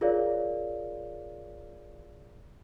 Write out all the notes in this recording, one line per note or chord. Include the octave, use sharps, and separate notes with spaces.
F4 G#4 A#4 C#5 D5 F5